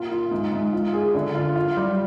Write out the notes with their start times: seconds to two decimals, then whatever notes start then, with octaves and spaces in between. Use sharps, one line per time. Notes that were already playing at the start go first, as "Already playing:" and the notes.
Already playing: A#2 F4
0.11 F4
0.31 G#2
0.52 G#2
0.73 F4
0.93 G#4
1.15 D3
1.35 F4
1.56 F4
1.77 G3